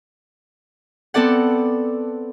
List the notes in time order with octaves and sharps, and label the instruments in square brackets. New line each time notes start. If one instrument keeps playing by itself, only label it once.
[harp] B3 C4 A4 D5 F#5